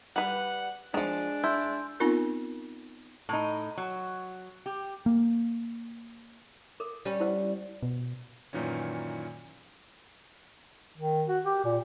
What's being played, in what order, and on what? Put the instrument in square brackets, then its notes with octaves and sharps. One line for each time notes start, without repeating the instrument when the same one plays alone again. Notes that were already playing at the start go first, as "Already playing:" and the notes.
[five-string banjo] G3 B4 [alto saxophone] F#5
[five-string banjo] D#3 F3 [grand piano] G#3 [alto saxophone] D4 [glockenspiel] G#5
[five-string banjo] E4 [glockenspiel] C6 E6 G6
[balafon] B3 C4 D#4 F4 A#4
[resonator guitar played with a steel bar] A2 D#4
F#3
G4
[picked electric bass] A#3
[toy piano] A#4 D6
[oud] G3 C#4
[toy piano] E4 C5 F#5
[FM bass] B2
[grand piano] F#2 A#2 D#3 E3 C#4
[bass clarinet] D#3
F#4
G4
A#2